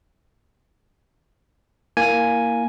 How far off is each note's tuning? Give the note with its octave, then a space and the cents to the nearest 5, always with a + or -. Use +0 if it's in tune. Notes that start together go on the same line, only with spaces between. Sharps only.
A#3 +0 E4 +0 G#5 +0